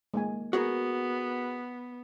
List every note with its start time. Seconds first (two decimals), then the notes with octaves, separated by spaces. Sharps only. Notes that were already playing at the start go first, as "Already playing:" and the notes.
0.14 G#3 A#3 G#5
0.53 B3 F#4 G#4 A#4